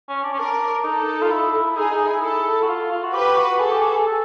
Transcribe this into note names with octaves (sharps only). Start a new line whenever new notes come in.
C#4
D4
C#4
D4 A#4
D#4 A4
F4
E4
E4
D#4 G#4
D#4
E4
E4 A4
F#4
F4
F4
F#4
G4 B4
F#4
G#4 A4
G4
G#4
G#4
A4